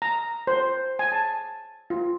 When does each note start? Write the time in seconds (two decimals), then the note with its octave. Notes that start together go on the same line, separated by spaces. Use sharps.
0.02 A#5
0.47 C5
0.99 G#5
1.12 A5
1.90 F4